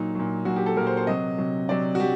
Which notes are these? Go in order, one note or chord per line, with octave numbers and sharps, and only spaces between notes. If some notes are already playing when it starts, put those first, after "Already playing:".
Already playing: A#2 F#3 D#4
A#2 F#3
A#2 F#3 F#4
G4
A4
A#2 F#3 A#4
C5
C5
C3 F#3 D#5
C3 F#3
C3 F#3 D5
F#4
F#3 G4